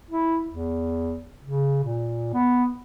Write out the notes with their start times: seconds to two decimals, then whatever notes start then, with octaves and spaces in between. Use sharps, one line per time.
0.10 E4
0.52 E2
1.44 C#3
1.84 A#2
2.34 B3